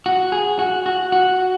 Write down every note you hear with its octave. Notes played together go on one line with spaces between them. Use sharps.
F#4
G#4
F#4
F#4
F#4